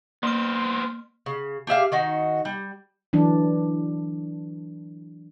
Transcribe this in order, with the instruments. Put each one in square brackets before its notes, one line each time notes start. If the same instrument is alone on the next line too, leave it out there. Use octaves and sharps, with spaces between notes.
[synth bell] A#3 F6 [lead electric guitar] B3 C5
[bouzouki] C#3
G4 G#4 E5 F5
D#3 D#4 F#4
G3
[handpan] E3 F#3 D4